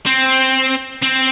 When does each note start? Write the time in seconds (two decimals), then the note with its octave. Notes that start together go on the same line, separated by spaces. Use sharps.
0.06 C4
1.02 C4